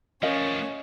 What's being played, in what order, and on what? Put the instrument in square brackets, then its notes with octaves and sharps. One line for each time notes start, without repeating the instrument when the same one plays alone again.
[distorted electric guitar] F3 A3 [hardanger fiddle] C#4 [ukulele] A#4 D#5 F5